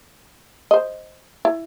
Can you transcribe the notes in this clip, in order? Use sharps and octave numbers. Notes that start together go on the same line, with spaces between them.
C5 D#5
E4